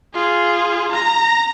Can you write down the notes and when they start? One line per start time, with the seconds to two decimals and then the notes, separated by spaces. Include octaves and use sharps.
0.14 F4 G#4
0.92 A#5 A#6